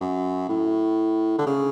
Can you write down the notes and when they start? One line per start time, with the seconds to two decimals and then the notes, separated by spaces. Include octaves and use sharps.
0.01 F#2
0.49 A2
1.39 D3
1.47 C#3